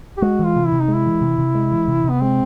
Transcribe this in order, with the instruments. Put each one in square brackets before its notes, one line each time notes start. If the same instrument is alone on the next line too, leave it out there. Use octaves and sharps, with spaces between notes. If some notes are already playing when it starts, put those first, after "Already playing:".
[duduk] G4
[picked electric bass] G#3 [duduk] F#4
[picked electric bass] E3
[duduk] F4
[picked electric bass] C3
[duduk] E4
[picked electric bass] C3
[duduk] D#4
[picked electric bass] G#3
[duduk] E4
[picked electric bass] E3
C3
C3
G#3
E3
C3
C3
[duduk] B3
[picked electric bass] G#3 [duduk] C4